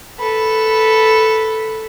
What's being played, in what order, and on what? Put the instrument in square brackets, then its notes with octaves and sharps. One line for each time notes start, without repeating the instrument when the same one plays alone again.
[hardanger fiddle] A4 B4